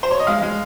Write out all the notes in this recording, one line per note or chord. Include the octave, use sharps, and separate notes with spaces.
C5
C#5
D#5
G#3 F5
G#3